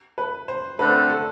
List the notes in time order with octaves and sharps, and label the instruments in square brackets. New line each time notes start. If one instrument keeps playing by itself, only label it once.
[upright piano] B4
C5
[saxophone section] D3 A3 C4 [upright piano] B4
[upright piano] A4